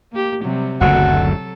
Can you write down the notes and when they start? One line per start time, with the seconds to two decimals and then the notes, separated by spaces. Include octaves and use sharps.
0.12 A#3 G4
0.42 C3 F#3 G3
0.81 F#1 D2 C#3 F#3 F#4 A4